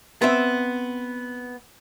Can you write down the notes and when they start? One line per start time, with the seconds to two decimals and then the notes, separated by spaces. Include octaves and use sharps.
0.22 B3 C4 E5